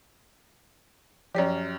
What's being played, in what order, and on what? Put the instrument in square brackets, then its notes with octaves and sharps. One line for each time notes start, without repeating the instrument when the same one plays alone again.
[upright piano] F#2 G4 [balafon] F3 C#5 D5